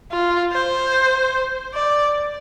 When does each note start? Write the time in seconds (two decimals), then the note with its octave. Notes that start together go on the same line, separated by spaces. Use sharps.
0.11 F4
0.52 C5
1.74 D5